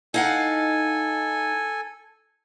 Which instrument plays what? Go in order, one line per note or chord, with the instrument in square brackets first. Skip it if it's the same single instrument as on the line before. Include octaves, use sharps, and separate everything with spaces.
[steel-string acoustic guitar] D#4 F5 F#5 [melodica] A4 G#5